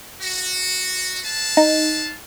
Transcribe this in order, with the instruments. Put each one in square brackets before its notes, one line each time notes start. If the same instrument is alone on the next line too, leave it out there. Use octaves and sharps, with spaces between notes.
[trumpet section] F#4
B4 F5 A5
[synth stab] D#4